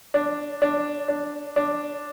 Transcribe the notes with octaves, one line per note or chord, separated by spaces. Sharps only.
D4
D4
D4
D4